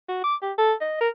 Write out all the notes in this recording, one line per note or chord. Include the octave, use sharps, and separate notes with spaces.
F#4
D6
G4
A4
D#5
A#4